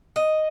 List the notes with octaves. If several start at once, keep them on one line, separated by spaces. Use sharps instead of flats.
D#5